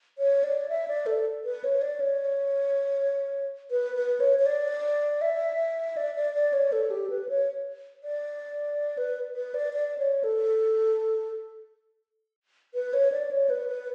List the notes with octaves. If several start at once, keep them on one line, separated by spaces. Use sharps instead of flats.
C#5
D5
E5
D5
A4
B4
C#5
D5
C#5
B4
B4
C#5
C#5
D5
E5
D5
D5
D5
C#5
A4
G4
B4
C#5
D5
B4
B4
D5
D5
C#5
A4
B4
C#5
D5
C#5
B4
B4